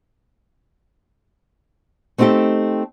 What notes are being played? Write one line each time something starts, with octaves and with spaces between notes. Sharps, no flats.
A3 C4 D#4 F#4 G4 A4